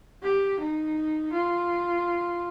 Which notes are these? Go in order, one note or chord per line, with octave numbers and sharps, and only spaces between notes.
G4
D#4
F4